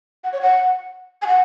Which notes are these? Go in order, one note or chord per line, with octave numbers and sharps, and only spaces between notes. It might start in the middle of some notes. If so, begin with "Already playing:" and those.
F#5
C#5
F#5
G#5
F#5